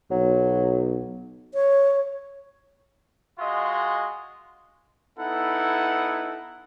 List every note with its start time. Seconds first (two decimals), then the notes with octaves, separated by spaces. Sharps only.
0.11 B1 F#3
1.54 C#5
3.39 G#3 F4 F#4 D#5
5.18 B3 D#4 E4 A4 F#5